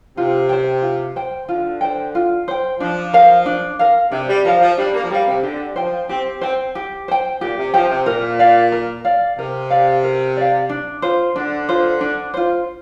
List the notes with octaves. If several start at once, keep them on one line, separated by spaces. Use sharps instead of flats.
C3 F4
C5 G5
F4
C5 G5
D3 F4
C5 G5
F4
C5 G5
F3 D4
A#4 F5
D4
A#4 F5
C3 D4
G3
F3 A#4 F5
F3
G3 D4
A#3
F3
G3 A#4 F5
C3
D3 G4
F3 C5 G5
C4 G4
C4 C5 G5
G4
C5 G5
A#2 G4
C3
F3 C5 G5
C3
A#2 A#4
D5 F5
A#4
D5 F5
C3 A#4
D5 F5
A#4
D5 F5
D4
F4 C5
D3 D4
F4 C5
D4
F4 C5